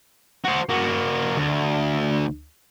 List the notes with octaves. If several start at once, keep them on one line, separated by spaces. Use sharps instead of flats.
F#4 C5
A#3 F#4
D2